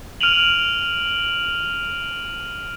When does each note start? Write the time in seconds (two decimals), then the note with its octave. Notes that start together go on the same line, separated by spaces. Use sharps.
0.21 F6 D7 D#7 F7 F#7